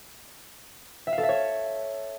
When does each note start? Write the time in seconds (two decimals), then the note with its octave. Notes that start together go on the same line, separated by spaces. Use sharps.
1.07 E5
1.12 F5
1.18 A4
1.23 E5
1.29 C#5